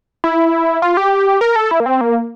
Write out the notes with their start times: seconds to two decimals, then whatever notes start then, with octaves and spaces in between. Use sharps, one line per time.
0.24 E4
0.82 F4
0.97 G4
1.41 A#4
1.56 A4
1.71 E4
1.80 A#3
1.86 C4
2.01 A#3